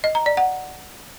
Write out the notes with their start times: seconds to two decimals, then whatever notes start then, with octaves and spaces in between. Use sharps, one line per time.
0.04 D#5
0.15 A#5
0.26 D5
0.37 F#5